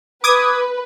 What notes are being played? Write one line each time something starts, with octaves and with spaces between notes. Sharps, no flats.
B4 D6 D#6 G#6